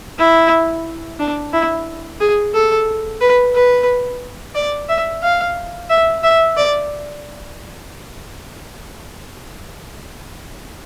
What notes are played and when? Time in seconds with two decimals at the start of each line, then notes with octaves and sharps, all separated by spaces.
0.19 E4
1.20 D4
1.53 E4
2.20 G#4
2.54 A4
3.21 B4
3.55 B4
4.55 D5
4.89 E5
5.23 F5
5.90 E5
6.23 E5
6.57 D5